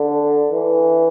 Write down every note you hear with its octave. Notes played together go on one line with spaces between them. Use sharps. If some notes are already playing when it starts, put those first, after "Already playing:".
Already playing: D3
E3